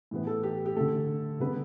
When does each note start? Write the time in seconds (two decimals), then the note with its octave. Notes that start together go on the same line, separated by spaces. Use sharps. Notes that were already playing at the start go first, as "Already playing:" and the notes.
0.11 A2 E3 B3
0.27 A4
0.43 G4
0.66 G4
0.76 D3 A3 A4
1.40 D3 G3 B3 B4